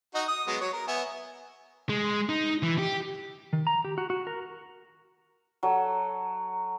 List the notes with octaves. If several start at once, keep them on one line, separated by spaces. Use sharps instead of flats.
D#4 F#4 D#5
D#6
F#3 G#3 B3
F#3 C#5
A#4
B3 E5 G#5
G#3
D#4
E3
G4
D#3
A#5
G4
F#4
F#4
A#4
F#3 A4